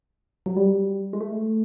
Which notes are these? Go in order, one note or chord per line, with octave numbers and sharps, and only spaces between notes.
F#3
G3
G#3
A3